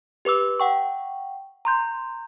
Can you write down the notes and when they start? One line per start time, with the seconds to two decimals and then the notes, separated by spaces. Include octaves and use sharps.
0.25 G4 B4 D6 E6
0.60 F#5 G5 C#6
1.65 A#5 C6 G6